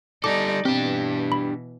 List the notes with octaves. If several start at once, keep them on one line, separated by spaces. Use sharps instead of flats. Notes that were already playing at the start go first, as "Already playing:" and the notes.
G3 D#4 A4 D5 D6
B2 E3 C4 D4 G4
B5